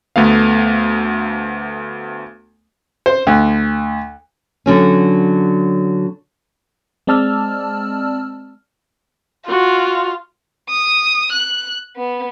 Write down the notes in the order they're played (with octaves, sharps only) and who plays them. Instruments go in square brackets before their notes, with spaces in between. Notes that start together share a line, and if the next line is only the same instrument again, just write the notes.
[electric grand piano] D2 A3 B3 F5
[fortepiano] C5
D2
[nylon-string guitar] D3 F#3 C#4
[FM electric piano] G#3 C4 D5 A5 E6 F6
[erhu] F4 [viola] F#4
[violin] D#6
F#6
B3